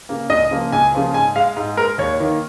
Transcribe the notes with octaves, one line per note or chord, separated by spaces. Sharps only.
C#3 A#3
C#2 D#5
C#3 F3 A#3
C#2 G#5
C#3 F3 A#3
G#2 G#5
G#3 F5
G#2
G#3 A#4
D#2 C#5
D#3 A#3